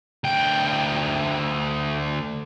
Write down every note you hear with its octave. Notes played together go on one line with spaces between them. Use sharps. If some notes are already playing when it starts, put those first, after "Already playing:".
D2 G5